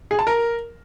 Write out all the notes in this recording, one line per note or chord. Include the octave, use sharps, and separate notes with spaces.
G#4
A5
A#4